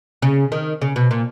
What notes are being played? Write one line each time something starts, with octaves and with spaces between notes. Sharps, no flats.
C#3
D#3
C#3
B2
A#2